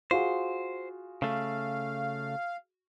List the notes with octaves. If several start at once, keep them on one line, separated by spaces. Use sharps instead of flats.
F4 F#4 G#4 C5
C#3 A3 F5